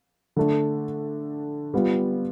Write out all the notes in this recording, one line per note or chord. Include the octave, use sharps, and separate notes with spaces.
D3 A3 D4
G3 B3 F4